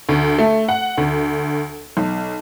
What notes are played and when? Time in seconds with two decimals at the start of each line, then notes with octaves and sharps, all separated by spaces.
0.09 D2
0.38 A3
0.68 F#5
0.98 D2
1.97 B1